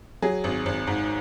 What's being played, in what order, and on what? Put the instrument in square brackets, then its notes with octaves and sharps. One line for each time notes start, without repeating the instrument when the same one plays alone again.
[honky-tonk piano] F#3 G#4
G#1
G#1
G#2